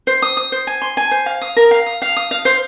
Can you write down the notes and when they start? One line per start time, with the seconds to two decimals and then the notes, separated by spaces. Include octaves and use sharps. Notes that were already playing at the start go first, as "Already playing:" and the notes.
0.07 C5
0.22 D#6
0.37 D#6
0.52 C5
0.67 G#5
0.82 C6
0.97 G#5
1.11 C5
1.26 F5
1.42 D#6
1.57 A#4
1.71 F5
1.86 D#6
2.02 F5
2.17 D#6
2.31 F5
2.45 C5